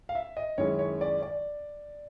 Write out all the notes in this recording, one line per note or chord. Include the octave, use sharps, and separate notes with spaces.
F5
E5
D#5
F#2 D#3 G#3 C#4 E4 C#5
C#5
D5
D5